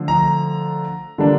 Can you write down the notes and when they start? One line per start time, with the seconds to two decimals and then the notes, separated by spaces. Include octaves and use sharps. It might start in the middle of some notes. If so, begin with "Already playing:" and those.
Already playing: D3 F3 A3
0.08 A#5
1.18 D3 G3 A#3 D4